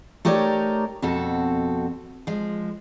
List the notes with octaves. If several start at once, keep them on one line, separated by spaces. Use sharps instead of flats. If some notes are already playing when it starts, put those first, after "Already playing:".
A3 D#4 G4 A#4 C#5 D5
F2 B2 C4 F#4 A4
F3 G#3